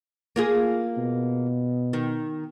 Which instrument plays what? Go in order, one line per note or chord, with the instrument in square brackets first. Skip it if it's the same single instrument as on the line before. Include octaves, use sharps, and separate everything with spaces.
[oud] A#3 F4 G#4
[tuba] B2
[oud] D#3